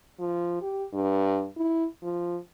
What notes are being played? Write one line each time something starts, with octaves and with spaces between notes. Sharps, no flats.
F3
G4
G2
E4
F3